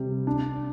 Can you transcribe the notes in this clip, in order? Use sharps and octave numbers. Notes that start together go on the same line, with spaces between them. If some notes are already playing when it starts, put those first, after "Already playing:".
Already playing: C3 G3
D4